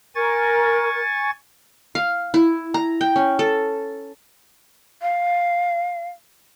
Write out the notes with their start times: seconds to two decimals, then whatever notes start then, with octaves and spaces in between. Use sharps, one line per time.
0.15 A#4 G#5 C#6 A6
1.95 F5
2.34 E4
2.74 A#5
3.01 G5
3.16 C#4
3.39 A4
5.02 F5